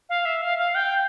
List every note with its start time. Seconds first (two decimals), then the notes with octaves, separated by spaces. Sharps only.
0.09 F5
0.25 E5
0.42 F5
0.58 F5
0.75 G5